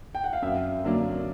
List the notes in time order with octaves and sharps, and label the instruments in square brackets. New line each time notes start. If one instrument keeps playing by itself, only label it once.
[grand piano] G5
F#5
F5
[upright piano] F#2 [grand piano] E5
[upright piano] D3 F#3 A#3 D4